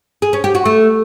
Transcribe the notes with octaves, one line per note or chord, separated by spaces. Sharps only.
G#4
C#4
G4
F#4
A3